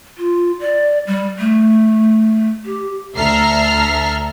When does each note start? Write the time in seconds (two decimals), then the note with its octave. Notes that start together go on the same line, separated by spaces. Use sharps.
0.18 F4
0.60 D5
1.07 G3
1.39 A3
2.66 G4
3.17 D2 A4 E5 A#5 F6 C7